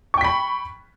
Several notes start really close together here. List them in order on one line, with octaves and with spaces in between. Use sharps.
C#6 G5 B6 B5